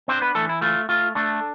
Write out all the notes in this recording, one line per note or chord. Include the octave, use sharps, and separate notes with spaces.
C4 D4 C5
B3 B4
E3 A3 A4
E4
A3 F4
A3 F4
A3 D4 A4